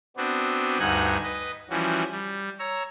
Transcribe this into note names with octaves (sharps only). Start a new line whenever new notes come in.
B3 C4 D4 F#4
D2 G2 D#4 F#5 G#5 F#6
B4 D#5
E3 F3 G3 C#4 F#4
G3
C#5 A#5 E6